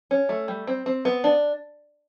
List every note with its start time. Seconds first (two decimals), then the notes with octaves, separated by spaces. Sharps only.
0.11 C#4
0.29 A3
0.48 G3
0.67 C4
0.86 C4
1.05 B3
1.24 D4